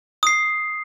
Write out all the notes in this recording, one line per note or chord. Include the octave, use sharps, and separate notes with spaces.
D#6 C7